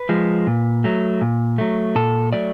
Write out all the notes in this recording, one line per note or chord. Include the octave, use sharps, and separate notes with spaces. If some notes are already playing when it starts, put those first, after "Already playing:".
Already playing: B4
F3 G#3
A#2
F#3 A3
A#2
F#3 A3
A#2 A4
F#3 A3 D5